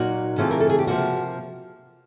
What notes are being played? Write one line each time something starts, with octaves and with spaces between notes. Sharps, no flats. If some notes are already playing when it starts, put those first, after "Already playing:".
Already playing: A#2 F#3 A#3 D#4 F#4
C#3 E3 A3 C4 F4
A#4
A4
G#4
G4
C3 F3 A#3 F#4